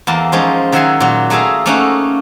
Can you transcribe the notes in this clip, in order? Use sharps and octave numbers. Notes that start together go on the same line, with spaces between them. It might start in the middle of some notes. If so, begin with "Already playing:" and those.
E2 A#3 A5
F3 G#3 C#4 D#4
D#3 F#3 E5 F#5 G#5 C6
A#2 F#3
A3 A#3 G#4 E5 F5
A3 A#3 C#4 D#4 F5 F#5